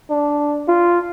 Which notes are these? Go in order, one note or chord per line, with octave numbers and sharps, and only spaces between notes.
D4
F4